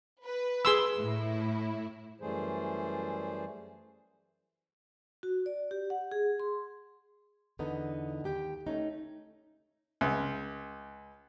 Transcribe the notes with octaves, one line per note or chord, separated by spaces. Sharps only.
B4
G#4 C6 E6
A2 E4
F#2 E3 G3 A3 G#4 C5
F#4
D5
G4
F#5
G#4
C6
E2 D3 B3 D#4
D#2 G4 G5
A3 C#4 D#4
C#2